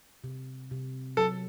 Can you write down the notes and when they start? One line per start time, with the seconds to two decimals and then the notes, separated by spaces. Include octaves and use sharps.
0.24 C3
0.71 C3
1.17 F#3 A4